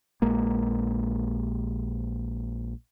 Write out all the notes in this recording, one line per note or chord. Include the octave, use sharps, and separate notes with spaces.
A#1 G#3 A#3